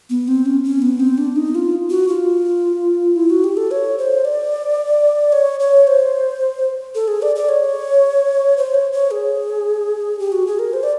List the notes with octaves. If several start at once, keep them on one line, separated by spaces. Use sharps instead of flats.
B3
C4
C#4
C#4
B3
C4
D4
D#4
F4
F#4
F4
E4
F#4
G4
A4
C#5
C5
D5
C#5
C#5
C5
A4
G#4
D5
D5
C#5
C5
C#5
C#5
G#4
G4
F#4
G#4
A#4
C5
D5